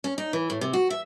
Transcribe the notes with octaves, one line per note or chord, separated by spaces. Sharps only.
C#4
D#4
E3
A2
C3
F#4
E5